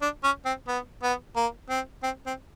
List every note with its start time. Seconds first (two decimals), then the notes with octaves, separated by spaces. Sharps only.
0.02 D4
0.24 C#4
0.46 C4
0.68 B3
1.03 B3
1.36 A#3
1.70 C4
2.03 C4
2.26 C4